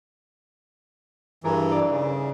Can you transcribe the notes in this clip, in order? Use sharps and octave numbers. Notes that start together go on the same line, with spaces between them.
G2 E3 G#4 A#4
D#4 A4 D5
C#3